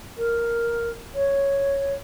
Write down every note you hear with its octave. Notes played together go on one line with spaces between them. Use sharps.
A#4
C#5